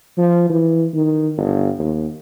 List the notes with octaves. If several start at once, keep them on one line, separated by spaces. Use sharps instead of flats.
F3
E3
D#3
G1
D#2